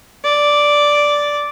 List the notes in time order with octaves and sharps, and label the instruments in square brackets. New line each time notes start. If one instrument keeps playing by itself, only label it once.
[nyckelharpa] D5